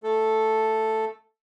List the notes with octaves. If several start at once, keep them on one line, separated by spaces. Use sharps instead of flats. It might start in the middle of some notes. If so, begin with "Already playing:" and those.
A3 A4